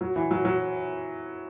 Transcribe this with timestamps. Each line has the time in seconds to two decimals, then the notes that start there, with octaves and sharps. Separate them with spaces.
0.01 F#3
0.16 E3
0.31 F#3
0.45 F#3